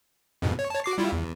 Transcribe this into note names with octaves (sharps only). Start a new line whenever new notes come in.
F2 G#2 B2
C#5
C#5 A5
F#4 D6 C7
G3 E4 F4
E2